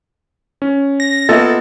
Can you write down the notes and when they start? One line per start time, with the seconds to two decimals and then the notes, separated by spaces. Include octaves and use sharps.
0.62 C#4
1.00 A#6
1.29 A#3 B3 F4 A4 D#5 E5